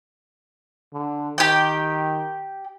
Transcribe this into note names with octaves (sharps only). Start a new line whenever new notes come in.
D3
D#3 G4 G5